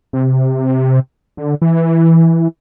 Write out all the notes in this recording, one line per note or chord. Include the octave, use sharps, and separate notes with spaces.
C3
D3
E3